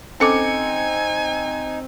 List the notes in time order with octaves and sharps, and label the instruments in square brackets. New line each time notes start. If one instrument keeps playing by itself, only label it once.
[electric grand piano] C4 C#7 [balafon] C#4 A4 D6 [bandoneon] D#4 [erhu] G#5